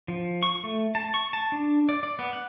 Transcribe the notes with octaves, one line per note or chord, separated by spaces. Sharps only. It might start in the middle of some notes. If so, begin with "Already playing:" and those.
F3
C#6
A3
A5
C#6
A5
D4
D5
D5
B3
F#5